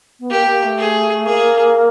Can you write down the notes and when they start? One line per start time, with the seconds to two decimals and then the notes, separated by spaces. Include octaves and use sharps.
0.19 B3
0.30 A#3 G4
0.47 A#3
0.63 A3
0.78 G#4
1.26 A#3 G#4